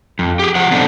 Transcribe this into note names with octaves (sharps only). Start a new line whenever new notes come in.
F2
G4 G#4
F3 C5 F#5
B3 C4 D4 D#4 A4